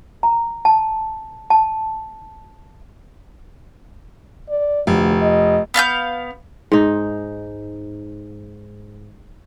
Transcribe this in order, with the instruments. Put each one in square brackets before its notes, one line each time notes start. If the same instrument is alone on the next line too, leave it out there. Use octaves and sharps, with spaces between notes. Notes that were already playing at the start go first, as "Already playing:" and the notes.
[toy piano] A#5
A5
A5
[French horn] D5
[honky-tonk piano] F1 [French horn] D2
[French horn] D#5
[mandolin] B3 F5 A5 G6
[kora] G#2 D#4